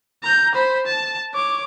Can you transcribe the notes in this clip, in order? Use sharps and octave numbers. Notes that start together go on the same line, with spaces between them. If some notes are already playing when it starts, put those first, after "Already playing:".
A#5 G6
C5 B5
A5
C#5 D6